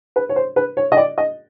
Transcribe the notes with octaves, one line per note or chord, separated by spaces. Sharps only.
B4
C#5
C5
B4
C#5
D#5
D5
D#5